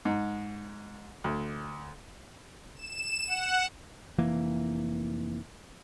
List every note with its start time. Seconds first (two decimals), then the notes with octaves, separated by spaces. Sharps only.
0.05 G#2
1.24 D2
2.75 E7
3.27 F#5
4.18 F1 E3 A#3